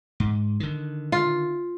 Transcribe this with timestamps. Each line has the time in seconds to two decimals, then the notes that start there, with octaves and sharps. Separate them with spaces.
0.20 G#2
0.60 D3 D#3
1.12 F4